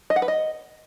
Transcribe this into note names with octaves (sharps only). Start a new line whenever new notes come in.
D#5
F#5
B4
D#5